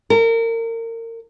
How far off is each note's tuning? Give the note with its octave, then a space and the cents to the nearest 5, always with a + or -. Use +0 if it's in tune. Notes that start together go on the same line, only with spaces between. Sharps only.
A#4 -30